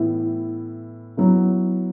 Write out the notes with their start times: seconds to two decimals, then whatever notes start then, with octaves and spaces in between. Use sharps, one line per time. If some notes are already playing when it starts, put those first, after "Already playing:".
Already playing: A2 E3 B3 E4
1.17 F#3 B3 E4